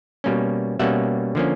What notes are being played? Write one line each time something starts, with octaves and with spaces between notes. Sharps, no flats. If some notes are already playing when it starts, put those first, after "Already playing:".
B2 G3 A#3 C#4
B2 G3 A#3 C#4 E5 F#5
D3 F3 A#3 C#4